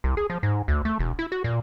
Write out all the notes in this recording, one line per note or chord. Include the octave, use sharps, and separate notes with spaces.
C2
G#4
F3
G#2
D2
A3
E1
E4
F#4
A#2